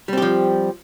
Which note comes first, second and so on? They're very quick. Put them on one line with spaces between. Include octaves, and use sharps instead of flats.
G3 C4 G4 F3